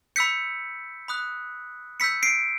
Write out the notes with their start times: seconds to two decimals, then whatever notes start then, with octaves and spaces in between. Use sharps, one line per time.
0.16 B5 E6 G6 B6 C#7
1.08 B5 D#6 F#6
2.00 B5 E6 G6 B6 C#7
2.23 C7 D7